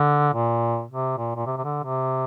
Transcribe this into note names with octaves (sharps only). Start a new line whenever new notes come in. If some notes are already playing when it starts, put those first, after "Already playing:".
Already playing: D3
A#2
C3
A#2
A#2
C3
C3
D3
C3